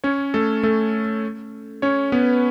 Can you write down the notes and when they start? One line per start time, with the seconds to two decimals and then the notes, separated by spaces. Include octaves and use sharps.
0.04 C#4 C#5
0.34 A3 A4
0.63 A3 A4
1.82 C#4 C#5
2.12 B3 B4